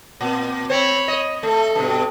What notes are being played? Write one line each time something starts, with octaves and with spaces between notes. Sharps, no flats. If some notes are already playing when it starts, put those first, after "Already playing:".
A#2 C4
C4 C5 C#5 B5
D#5
A3 A4
G2 B2